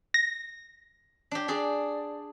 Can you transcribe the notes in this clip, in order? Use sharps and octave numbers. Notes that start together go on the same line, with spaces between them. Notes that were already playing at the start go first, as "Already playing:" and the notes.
A#6
D4 G4
D4 G#4 D5